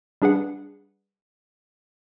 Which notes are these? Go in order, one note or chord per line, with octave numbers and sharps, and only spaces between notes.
G3 D4 G#4 B4 F#5